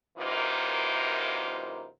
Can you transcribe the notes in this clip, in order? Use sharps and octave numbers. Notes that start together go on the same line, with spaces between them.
F#2 C3 E3 A#3 D#4 F4